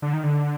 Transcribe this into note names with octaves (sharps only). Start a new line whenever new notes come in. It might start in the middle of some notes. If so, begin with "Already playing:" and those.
D3
D#3
D3